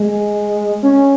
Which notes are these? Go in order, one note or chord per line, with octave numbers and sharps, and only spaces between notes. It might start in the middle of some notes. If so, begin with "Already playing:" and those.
Already playing: G#3
C#4